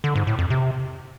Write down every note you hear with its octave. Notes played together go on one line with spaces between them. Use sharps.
D3
G#2
A2
F2
C3